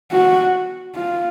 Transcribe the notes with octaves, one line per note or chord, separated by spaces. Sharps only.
F#4
F4